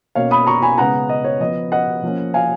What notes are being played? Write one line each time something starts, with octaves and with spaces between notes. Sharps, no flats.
B2 A#3 C#4 C#5 F5
B5 D#6
A#5 C#6
G#5 B5
C#3 G#3 B3 F#5 A#5
D#5
C#5
F3 B3 D#5
D#5 F#5
F3 A#3 C#4
F5 G#5